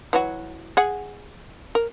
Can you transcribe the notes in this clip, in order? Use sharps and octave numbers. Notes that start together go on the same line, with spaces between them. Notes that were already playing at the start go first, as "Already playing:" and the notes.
E3 F#3 F#4
G#4 F#5
A#4